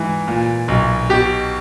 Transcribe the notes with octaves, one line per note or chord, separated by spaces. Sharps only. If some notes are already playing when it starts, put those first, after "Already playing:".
Already playing: G#2 E3
A#2
B1
B2 G4